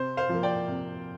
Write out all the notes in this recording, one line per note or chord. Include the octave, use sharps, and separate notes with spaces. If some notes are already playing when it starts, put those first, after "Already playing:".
Already playing: C3 C5
C5 F5
F3 A#3
D5 G5
C3